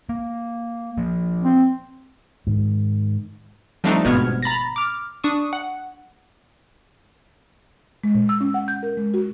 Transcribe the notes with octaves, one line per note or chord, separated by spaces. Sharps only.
A#3
F3 A#3
C4
G#2 D#3
F3 G3 A3 C4 D4 D#4
G1 G#2 B2 B3 F6 G#6
A#5 B5 A6 A#6
D6 F6
D4 C#6 D#6
F#5
G#3
A#2
E6
C#4
F#5
G6
A#4
G#3
F#4